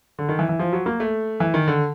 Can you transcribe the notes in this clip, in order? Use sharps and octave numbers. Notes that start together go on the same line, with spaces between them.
D3
D#3
E3
E3
F3
F#3
A#3
A3
E3
D#3
D3